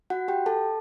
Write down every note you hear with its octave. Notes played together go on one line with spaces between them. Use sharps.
F#4 F#5
G4 G5
A4 A5